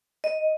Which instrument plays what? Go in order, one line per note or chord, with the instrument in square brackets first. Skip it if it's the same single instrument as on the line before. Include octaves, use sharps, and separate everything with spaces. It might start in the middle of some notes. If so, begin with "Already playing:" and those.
[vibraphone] D#5